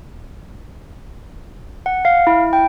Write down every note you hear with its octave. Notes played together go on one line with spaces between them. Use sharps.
F#5
F5
E4
G5